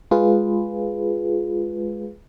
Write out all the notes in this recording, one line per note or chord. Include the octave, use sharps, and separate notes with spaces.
G#3 F4 G#4 B4